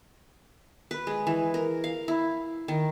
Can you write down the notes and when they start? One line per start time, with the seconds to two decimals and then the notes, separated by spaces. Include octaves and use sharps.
0.91 B4
1.07 G#3
1.27 E3
1.54 A#4
1.84 F5
2.08 E4
2.68 D#3